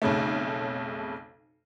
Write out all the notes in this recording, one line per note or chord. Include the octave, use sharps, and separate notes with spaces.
B1 F2 C#3 A3